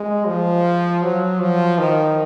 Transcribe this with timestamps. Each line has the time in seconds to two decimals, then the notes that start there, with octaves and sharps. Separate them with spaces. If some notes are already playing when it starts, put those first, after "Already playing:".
Already playing: G#3
0.27 F3
1.03 F#3
1.40 F3
1.78 D#3